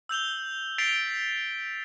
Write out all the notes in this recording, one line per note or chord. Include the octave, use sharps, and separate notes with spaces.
E6 G6 F7 G7
A6 B6 C7 D7 F7 G7